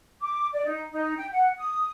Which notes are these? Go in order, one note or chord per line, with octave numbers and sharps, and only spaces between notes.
D6
D5
D#4
D#4
G5
F#5
D#6